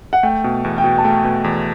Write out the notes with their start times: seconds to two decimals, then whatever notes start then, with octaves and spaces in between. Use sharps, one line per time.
0.13 F#5
0.23 A3 G5
0.44 B2
0.64 E2
0.78 G5
0.84 B2
0.98 A5
1.04 A3 G5
1.24 B2
1.44 E2